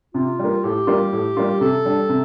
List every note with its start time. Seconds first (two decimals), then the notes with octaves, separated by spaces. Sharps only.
0.14 C3 F4
0.39 G3 A#3
0.64 A2 G4
0.87 G3 A#3 F4
1.13 A2
1.37 G3 A#3 F4
1.61 C3 A4
1.85 G3 D4
2.09 C3